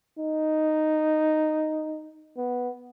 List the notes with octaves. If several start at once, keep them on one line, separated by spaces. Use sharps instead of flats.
D#4
B3